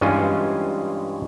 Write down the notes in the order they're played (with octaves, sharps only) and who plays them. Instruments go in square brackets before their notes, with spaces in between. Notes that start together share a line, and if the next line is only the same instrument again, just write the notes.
[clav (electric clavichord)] G2 E3 G#3 C#4 F4 G#5